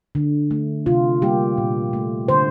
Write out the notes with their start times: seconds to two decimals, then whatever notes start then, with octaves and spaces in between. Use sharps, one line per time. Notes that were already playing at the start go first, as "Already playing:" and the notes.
0.15 D3
0.51 A3
0.86 C3 F4
1.22 G3 A#3 G4
1.58 A#2
1.93 A3
2.28 D3 C5